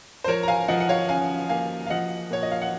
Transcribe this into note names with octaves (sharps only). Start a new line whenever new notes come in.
C5
F3 A#4 C#5
A#5
F5 G#5
F3 D#5 F#5
F#5
C#5 F5
C#4 F5 G#5
A#3 F5 G#5
F5
F3 D#5 F#5
A#2 C#5
D#5
F5
F#5